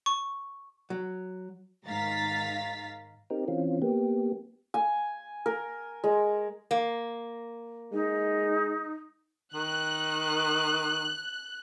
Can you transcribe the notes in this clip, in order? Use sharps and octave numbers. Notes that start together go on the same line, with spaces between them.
C#6
F#3
G#2 D#3 F5 A#5 A6 B6
C4 D#4 G4 A#4
E3 C4 C#4 F4
A#3 B3 G4
G#5
A#4
G#3
A#3
G#3 D#4
D#3 F#6